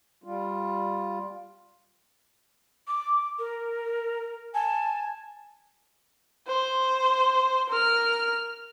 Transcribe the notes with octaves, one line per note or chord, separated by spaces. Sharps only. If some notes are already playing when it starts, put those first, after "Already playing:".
G3 F4
D6
A#4
G#5 A5
C5
A#4 F6